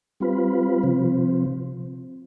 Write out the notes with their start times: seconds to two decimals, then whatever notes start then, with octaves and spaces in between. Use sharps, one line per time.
0.20 G3 C4 F4 B4
0.83 C3 F3 C4